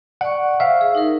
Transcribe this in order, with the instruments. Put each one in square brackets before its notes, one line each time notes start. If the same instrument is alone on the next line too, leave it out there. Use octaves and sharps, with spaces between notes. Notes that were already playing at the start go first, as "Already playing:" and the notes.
[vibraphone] D5 C#6 [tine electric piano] F#5
[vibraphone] C5 [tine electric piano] E5 F5
[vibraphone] G#4
D#4 A#4